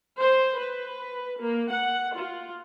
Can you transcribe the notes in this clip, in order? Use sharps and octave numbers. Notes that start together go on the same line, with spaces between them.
C5
B4
A#3
F#5
F4